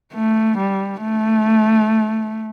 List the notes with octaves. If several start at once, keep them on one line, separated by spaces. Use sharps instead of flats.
A3
G3
A3